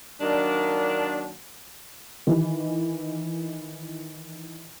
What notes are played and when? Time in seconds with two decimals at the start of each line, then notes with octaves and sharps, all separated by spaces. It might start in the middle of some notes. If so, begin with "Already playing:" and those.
0.21 D#3 F#3 A#3 D4
2.27 D#3 E3